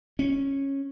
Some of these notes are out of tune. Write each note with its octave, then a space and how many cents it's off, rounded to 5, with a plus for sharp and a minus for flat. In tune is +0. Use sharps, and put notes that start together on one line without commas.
C#4 -10